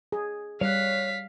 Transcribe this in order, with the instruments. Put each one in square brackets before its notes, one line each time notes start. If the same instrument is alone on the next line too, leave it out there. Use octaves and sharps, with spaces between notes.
[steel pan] G#4
[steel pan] G3 [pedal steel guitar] C#5 F#6 [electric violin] F5 B6